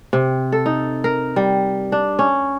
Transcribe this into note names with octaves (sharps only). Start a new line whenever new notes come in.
C3
A4
D#4
A#4
G3
D4
C#4